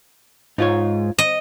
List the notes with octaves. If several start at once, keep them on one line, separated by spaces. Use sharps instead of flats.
G#2 D#4 F4 C#5
D#5